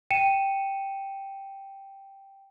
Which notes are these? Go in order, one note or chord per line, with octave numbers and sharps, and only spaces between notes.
G5 C#7 D#7 E7